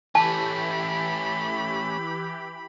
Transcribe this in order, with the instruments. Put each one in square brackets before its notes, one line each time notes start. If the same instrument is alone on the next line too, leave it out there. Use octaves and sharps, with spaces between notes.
[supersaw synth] E3 G4 [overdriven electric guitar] A3 C#4 [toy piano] A5 [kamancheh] B5